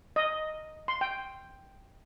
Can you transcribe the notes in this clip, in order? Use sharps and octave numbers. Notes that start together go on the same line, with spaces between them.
D#5
C6
G5